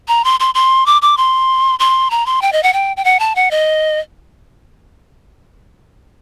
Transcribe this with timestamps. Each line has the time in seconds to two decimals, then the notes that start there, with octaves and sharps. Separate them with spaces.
0.08 A#5
0.24 C6
0.40 C6
0.55 C6
0.86 D6
1.02 D6
1.17 C6
1.80 C6
2.11 A#5
2.26 C6
2.42 G5
2.53 D#5
2.63 F#5
2.73 G5
2.97 G5
3.05 F#5
3.20 A5
3.36 F#5
3.51 D#5